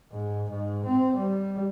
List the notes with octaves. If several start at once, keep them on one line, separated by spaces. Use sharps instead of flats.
G#2
G#2
C4
G3